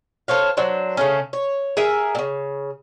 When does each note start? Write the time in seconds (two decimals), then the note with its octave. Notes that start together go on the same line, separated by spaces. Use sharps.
0.28 A4 C5 C#5 F5
0.57 F#3 D4 C5
0.97 C#3 A3 C#4
1.33 C#5
1.77 G#4 A#4 E5
2.15 A#2 C#3